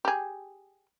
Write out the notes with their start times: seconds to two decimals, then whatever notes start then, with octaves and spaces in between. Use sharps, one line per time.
0.05 G4 G#4